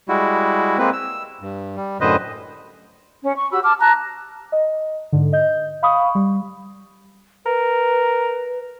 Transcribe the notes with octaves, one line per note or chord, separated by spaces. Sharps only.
G3 G#3 E4 F#4
G#3 A#3 C4 B4
E6
G2
G3
F#2 A2 D3 B4 C5 D#5
C#4
C#6
F#4 G4 B5 E6
A5 D6 F6
A5 A#5 F#6
D#5
G#2 D3
D#5 G6
F5 B5 C#6 D#6
G3
A#4 B4